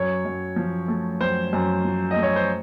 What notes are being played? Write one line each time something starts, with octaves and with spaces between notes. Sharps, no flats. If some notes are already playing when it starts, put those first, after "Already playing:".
Already playing: F#2 C#5
F#2
F3
A3
F#2 C5
F#2
F3
D#5
A3
C#5
C5